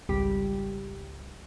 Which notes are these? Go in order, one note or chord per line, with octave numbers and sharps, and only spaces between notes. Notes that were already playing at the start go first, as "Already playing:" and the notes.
G#1 C#2 G3 G4